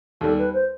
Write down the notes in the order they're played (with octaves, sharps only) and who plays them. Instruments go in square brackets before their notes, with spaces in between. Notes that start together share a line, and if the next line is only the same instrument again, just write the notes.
[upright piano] D#2 D#3 G3 [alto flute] A4
[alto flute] B4
C5